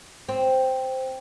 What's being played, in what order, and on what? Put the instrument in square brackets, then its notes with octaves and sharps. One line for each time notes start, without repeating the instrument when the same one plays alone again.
[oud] C4